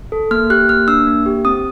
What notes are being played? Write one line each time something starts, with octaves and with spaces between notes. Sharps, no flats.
A4
A#3 F6
G4 F#6
A#3 F6
D4 E6
A#3
G4
C4 D#6